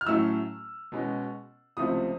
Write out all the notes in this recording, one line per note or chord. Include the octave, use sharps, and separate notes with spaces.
F6
A2 F#3 A3 C#4 E6
B2 G#3 C#4
C#2 C3 F3 A3 C4 D#6